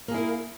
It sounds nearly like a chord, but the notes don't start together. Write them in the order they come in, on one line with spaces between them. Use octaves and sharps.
A#3 G#4 E4 A#4